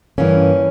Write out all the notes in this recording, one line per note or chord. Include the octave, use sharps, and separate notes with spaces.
G2 E3 A#3 C#4